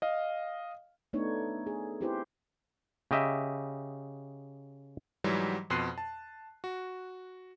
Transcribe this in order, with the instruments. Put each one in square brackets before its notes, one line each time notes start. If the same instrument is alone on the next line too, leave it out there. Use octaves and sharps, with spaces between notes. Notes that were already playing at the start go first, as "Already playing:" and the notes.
[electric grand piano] D#5 F5
[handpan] A3 B3 D4 D#4 C#5
G#4
C4 E4 G4 B4 C5
[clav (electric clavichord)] C#3 G4 D#5 E5
[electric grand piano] G#2 E3 F#3 G3
F2 B2 C6 F#6 C7 D#7
A5
F#4